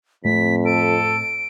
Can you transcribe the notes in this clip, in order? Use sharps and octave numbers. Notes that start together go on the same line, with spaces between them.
F2 A2 A3 C4 B6
A4 D7